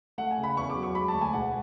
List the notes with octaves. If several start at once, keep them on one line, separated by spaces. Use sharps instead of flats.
A3 F#5
G#5
C#3
B5
E2 C#6
D6
F#3
C#6
G#3 B5
A5
D2
G#5
E1 F#5